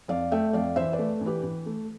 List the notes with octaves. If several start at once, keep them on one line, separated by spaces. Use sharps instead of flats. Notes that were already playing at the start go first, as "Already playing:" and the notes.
F2 D5 F5
A3 E5 G5
F2 D5 F5
E3 C5 E5
B4 D5
A3
E3
G4 B4
E3
A3